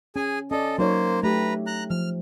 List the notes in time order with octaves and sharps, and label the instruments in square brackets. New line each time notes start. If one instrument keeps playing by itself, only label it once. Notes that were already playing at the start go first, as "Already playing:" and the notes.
[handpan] C#4 [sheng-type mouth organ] G#4 G#5
[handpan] C#4 D5 [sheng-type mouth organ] A4 D#5
[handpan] F#3 D#4 C#5 [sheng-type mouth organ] A#3 C5
[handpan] A3 G4 [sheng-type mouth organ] B4 A#5
[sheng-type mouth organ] A#5 F#6
[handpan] F3 [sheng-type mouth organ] F6